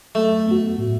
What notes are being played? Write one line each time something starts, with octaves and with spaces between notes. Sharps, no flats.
F#3 A3
B3 F#4
A2